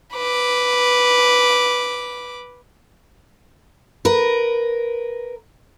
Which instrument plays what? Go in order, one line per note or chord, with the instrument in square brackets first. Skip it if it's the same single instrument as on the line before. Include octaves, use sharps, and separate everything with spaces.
[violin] B4 D6
[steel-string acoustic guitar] A#4 B4